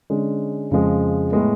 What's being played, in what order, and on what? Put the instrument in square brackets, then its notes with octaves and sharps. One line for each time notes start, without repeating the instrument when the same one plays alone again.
[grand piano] D3 G#3 C#4
F2 C#3 F3 G#3
A2 G#3 B3